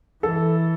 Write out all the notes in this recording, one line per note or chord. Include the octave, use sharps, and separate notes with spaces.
E3 A4